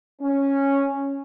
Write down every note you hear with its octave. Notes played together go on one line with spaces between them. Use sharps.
C#4